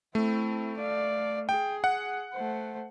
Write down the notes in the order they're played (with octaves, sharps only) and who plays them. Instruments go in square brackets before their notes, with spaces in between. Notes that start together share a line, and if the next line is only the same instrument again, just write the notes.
[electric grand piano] A3 [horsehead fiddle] C4 E4
[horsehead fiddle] D5 F5
[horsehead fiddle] G#4 [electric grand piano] G5
[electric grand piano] F#5
[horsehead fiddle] A3 C5